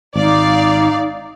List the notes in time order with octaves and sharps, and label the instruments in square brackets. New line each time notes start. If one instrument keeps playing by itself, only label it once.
[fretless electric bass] G#1 [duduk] D#4 [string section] D5 F5